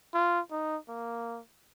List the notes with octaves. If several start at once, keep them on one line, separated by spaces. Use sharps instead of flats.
F4
D#4
A#3